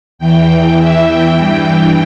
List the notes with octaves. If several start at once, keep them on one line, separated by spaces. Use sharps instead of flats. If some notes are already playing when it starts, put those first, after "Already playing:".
E2 E3 G5
E5
G5
G2 E3